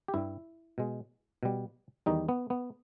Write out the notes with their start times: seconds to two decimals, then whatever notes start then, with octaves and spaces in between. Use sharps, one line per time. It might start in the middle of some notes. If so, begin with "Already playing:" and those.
0.08 G4
0.14 G2 G3 E4
0.78 B2 G#3
1.43 B2 G3
2.06 E2 D#3 G3 D#4
2.29 B3
2.50 B3